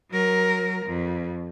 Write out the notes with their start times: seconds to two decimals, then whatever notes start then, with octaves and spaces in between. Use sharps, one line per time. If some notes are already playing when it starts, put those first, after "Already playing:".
0.11 F#3 A#4
0.86 F2